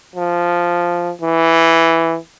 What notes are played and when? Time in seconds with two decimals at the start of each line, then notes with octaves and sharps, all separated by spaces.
0.15 F3
1.22 E3